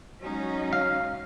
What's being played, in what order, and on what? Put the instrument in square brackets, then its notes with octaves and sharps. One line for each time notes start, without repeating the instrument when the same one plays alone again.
[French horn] F#3 [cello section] G#3 C#4 D#4
[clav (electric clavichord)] F5